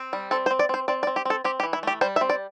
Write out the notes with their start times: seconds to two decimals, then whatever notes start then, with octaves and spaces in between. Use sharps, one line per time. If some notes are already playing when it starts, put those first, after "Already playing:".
Already playing: C4
0.13 G3
0.31 C4 A4
0.46 C5
0.51 C4
0.59 D5
0.69 C4 C5
0.88 C4 D5
1.03 D5
1.07 C4
1.16 G4
1.25 C4 A4
1.44 C4 G4
1.60 G4
1.63 E3
1.73 E4
1.83 A3 G4
2.01 G3 C5
2.16 E5
2.21 C4
2.29 D5